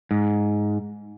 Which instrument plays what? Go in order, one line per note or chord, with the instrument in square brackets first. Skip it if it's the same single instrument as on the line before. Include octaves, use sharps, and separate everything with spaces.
[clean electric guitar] G#2